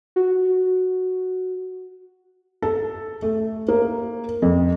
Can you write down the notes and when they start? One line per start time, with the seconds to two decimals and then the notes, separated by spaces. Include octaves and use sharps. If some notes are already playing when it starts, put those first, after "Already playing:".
0.16 F#4
2.62 A4
3.22 A3
3.68 A#3
4.42 F2